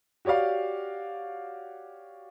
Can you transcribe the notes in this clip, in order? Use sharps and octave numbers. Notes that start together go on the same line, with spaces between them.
F#4 G4 C#5 D5 F5